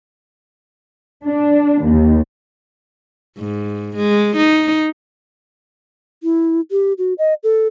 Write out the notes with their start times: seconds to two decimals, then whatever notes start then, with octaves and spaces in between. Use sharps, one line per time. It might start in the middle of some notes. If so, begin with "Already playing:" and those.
1.25 D4
1.85 D#2
3.38 G#2
3.97 G#3
4.37 D#4
6.23 E4
6.71 G4
6.98 F#4
7.18 D#5
7.44 A4